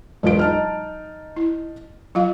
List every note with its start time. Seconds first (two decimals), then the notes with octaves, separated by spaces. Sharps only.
0.23 E1 F#3 G#3 F4 D7
0.39 D#4 A5 F6
1.36 E4
2.15 F#3 F4 F5